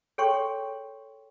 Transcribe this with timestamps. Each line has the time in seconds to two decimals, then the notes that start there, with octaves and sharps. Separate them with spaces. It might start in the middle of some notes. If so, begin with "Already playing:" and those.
0.18 G#4 A4 C#5 G5 C6 C#6